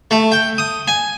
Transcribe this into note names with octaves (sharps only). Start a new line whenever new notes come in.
A3
G5
D#6
G#5